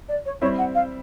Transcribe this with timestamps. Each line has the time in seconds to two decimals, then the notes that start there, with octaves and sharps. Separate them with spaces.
0.09 D5
0.25 C#5
0.41 G3 C4 E4 C#5
0.58 F#5
0.75 F5